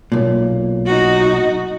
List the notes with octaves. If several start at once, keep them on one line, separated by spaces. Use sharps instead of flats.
B1 A#2
D#4 F#4